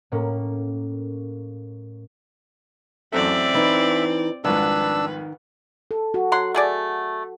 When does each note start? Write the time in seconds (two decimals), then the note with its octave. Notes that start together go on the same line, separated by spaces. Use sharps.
0.12 A2 A#3 C#4
3.13 A1 F#2 C4 A4 D5 E5
3.54 E3 D#4
4.45 C2 F2 G#2 D#3 D4 B4 E6
5.91 A4
6.14 F#4
6.32 F#3 F#5 C6
6.55 A3 G#4 D5